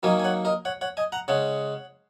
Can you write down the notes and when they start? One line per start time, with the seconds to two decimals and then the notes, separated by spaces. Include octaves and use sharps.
0.03 D#3 F#3 A#3 C#4 D#5 G#5
0.20 G#5
0.24 C#5 F#5
0.45 A#4 D#5
0.65 C#5 F#5
0.81 C#5 F#5
0.97 D#5 G#5
1.12 F#5 A#5
1.28 C#3 G#3 C#4 C#5 F#5